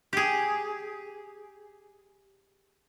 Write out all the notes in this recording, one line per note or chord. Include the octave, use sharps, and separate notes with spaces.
G4 G#4